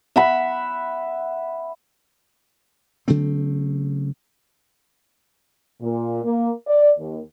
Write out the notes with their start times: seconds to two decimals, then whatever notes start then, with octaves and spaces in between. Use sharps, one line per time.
0.16 E5 F#5 B5
3.08 C#3 F#3 A3 C4
5.81 A#2
6.24 A#3
6.67 D5
6.98 D#2